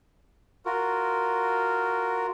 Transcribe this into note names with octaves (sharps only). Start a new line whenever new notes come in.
F4 F#4 A#4